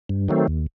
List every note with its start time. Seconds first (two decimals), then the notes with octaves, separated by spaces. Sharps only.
0.09 G2
0.28 D#3 F#3 A3 C4
0.48 D#2